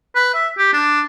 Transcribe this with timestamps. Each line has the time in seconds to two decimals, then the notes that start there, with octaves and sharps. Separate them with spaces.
0.15 B4
0.35 E5
0.58 G4
0.73 D4